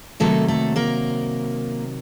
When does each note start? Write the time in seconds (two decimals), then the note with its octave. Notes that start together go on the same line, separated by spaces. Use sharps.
0.20 C3 D#3 F#3 A3 A#3 A4
0.48 A3 A4
0.76 A#3 A#4